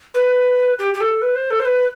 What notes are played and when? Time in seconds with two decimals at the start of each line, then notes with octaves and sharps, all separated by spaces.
0.14 B4
0.79 G4
0.94 G4
1.01 A4
1.22 B4
1.35 C5
1.51 A4
1.60 C5
1.65 B4